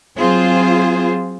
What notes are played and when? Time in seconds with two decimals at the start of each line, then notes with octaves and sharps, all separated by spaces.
0.18 F#3 C4 F4 G#4 C5